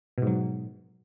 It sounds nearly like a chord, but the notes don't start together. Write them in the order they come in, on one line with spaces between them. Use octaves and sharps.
B2 G#2 F#3